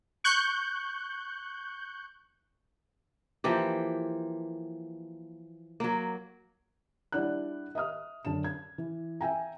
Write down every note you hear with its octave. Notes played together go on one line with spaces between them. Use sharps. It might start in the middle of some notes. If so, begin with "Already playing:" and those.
C#6 F#6 G6
E3 F3 A#3 G4
F#3 A#3
G3 D4 E4 D5 F#5 F#6
D#5 E5 D#6 F6
F#2 D3 A5 E7
G#6
E3
E5 G5 G#5 A#5